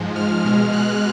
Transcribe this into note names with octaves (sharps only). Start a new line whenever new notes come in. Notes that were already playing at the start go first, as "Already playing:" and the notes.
Already playing: G#2 F3 G#3
F6
B2 G#3
F#6